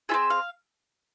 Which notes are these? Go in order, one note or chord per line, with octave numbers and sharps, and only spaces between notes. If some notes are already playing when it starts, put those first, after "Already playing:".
C4 F4 G#4 E5
F5